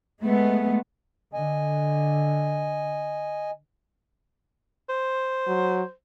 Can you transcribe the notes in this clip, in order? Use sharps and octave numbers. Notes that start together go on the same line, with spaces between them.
G#3 A3 B3
D3 D#5 G#5
C5
F#3